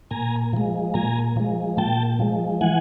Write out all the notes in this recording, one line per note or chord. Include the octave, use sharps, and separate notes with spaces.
A#2 G#5 A#5
F3 G#3
A#2 G#5 A#5
F3 G#3
A#2 G5 A5
F3 G#3
E3 F#5 G#5